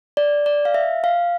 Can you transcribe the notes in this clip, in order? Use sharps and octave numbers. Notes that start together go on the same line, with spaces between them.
D5
D5
F5
E5
F5